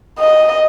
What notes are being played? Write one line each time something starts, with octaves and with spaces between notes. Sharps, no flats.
D#5